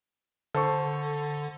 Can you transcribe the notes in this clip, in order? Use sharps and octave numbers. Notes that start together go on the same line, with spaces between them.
D3 A4 C5 C#6